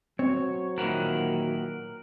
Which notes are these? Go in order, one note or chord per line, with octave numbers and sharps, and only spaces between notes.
F#3 C4 C#5
A#2 D#3 E3 A#4 F#5